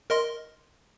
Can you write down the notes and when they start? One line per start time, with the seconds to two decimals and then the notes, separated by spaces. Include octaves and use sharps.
0.10 A#4 D#5 C6